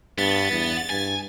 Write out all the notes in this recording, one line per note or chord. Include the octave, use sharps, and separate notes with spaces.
G2 B3 A6
E2
G2 G#5